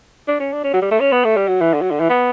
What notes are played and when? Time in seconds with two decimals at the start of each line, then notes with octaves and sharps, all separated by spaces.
0.28 D4
0.40 C#4
0.53 D4
0.64 C#4
0.73 F#3
0.82 G3
0.91 A3
1.00 C#4
1.12 B3
1.25 A3
1.36 G3
1.48 F#3
1.61 E3
1.74 D3
1.81 F#3
1.91 D3
2.00 E3
2.10 B3